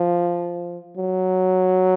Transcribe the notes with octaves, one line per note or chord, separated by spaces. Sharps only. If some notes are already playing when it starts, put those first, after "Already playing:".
Already playing: F3
F#3